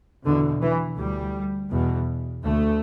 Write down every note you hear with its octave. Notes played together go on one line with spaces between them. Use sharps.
E2 B2 D3
E3
D2 G3
E2 B2
D2 A3